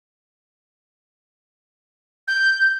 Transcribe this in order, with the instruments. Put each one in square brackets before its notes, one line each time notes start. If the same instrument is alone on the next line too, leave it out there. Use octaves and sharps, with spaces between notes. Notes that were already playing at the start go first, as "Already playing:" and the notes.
[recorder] G6